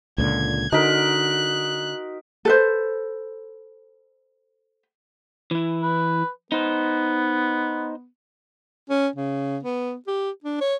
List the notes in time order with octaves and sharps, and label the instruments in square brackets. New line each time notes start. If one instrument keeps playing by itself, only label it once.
[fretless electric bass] C#2 A#2 D3 [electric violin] G#6
[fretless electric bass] D3 [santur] D#4 A#4 [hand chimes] F#4 B6 [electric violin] F#6
[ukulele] A4 B4 C5
[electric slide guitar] E3 E4
[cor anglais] B4
[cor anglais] B3 [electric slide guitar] D#4 C5
[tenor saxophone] C#4
C#3
B3
G4
D4
C#5